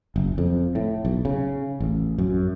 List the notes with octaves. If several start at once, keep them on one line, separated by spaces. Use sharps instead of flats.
F#1
F2
A2
B1
C#3
A1
F#2